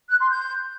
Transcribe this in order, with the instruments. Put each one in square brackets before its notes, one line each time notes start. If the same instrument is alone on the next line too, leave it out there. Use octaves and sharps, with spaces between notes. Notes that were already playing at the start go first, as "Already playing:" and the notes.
[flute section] F#6
C6
G6